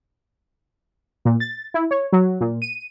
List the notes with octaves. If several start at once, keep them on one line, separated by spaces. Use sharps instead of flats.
A#2
A6
E4
C#5
F#3
A#2
D#7